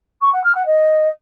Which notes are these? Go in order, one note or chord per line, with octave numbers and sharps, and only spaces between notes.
C#6
F#5
F6
F#5
D#5